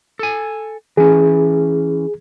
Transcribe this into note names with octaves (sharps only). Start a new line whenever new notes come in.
A4 G#5
E3 C#4 G#4